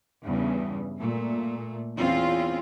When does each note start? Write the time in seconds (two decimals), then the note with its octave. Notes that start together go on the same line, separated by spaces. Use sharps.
0.22 E2 G2 C#3
0.99 A#2 A3
1.98 E2 C4 C#4 F4